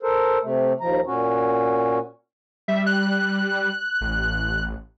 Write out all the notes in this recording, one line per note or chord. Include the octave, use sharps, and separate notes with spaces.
A4 A#4 C5
C3 A3
D#2 F3 A#5
A#2 C#4 F#4
G3 E5
F#6
A1